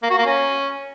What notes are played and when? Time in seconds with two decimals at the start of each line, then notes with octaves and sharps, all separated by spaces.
0.03 A#3
0.10 F#4
0.18 A#3
0.26 C#4